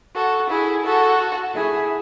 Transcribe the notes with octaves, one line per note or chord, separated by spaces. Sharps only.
F#4 A4
E4 G#4
F#4 A4
E4 G#4